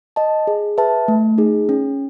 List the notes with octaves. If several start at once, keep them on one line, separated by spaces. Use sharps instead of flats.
D#5 A5
G#4
B4 E5 A5
A3
D#4 G#4
C#4